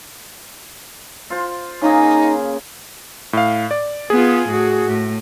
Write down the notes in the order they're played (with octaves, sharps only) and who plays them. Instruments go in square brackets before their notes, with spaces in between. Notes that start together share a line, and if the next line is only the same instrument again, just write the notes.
[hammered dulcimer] F4 C5
[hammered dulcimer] C#3 A#3 G#4 [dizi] D#4
[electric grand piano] A2 F5
D5
[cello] B3 F4 [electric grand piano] G#4
[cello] A2 F#4
A2